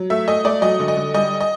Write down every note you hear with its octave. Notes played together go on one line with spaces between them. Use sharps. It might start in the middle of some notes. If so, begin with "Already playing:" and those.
Already playing: F#3
A3 E5
A3 D#5
A3 D5
F#3 D#5
D3
D#5
D3
G3 D#5
D#5